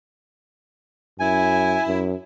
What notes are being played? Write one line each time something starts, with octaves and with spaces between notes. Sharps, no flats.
F#2 E4 G#5
F#2